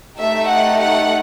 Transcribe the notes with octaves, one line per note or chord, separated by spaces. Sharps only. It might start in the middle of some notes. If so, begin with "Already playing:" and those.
A3 D#4 G4 E5
F#5
F#5